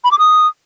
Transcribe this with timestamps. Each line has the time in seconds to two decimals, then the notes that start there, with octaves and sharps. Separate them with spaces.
0.04 B5
0.12 D6
0.19 D#6